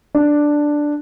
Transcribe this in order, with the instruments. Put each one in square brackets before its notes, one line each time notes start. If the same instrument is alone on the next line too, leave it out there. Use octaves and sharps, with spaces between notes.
[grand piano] D4